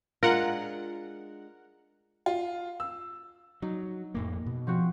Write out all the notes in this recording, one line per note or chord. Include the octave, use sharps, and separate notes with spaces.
G#3 D4 F4 A#4 F#5
F4
E6
F#3 D#4
F2 A2 A#3
B2
F3 C4 F#4